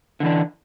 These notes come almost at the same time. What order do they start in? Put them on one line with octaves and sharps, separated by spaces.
D3 E3 D4